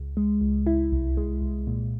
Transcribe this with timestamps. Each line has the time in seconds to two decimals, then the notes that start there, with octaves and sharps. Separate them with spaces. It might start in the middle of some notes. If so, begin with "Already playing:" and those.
Already playing: C#2
0.17 G#3
0.41 C#2
0.66 E4
0.92 C2
1.17 G#3
1.41 C2
1.67 A#2